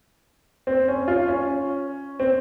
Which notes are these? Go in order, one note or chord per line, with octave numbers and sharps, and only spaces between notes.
C4
C#4
F4
C#4
C4